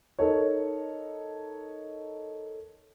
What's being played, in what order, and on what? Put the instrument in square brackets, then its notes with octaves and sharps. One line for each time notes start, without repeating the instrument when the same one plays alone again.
[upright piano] D#4 A4 A#4 C#5